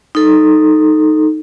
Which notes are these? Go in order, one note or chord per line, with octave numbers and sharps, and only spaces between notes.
D#4 A4